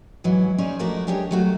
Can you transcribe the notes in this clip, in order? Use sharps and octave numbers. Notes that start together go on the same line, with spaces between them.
G#2 E3 F#3 E4
C#4 D#4 G#4 C5 D5
F3 G#3 A3 F#4 A#4 D5
G#3 D4 G4 G#4 C#5
F#3 A3 F#4